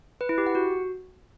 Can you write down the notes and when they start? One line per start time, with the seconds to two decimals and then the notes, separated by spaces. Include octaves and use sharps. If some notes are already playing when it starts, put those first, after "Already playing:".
0.21 B4
0.29 E4
0.38 G4
0.46 F#5
0.55 F#4